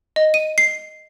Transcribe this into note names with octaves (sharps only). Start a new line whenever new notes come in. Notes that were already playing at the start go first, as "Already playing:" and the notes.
D#5
D#7
C7